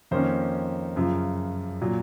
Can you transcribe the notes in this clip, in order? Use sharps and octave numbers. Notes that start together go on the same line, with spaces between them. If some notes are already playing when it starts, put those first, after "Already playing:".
F2 D#3 A#3 C#4 C5
F#2 C#3 F3
A#2 F#3